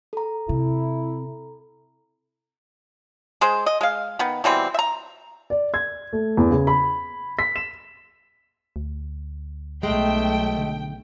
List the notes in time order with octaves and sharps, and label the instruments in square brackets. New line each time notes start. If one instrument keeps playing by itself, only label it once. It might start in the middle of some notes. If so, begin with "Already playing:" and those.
[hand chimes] A4 A#5
[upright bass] C3 [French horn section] E4
[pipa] G#3 G#4 C5
D#5
G#3 F5
D#3 B3
B2 E3 G3 C4
E5 A#5
[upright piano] D5
G#6
A3
E2
C#3
B5
B6
E7
[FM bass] D2
[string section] B1 G5 [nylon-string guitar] G#3 [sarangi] A3
[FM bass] D3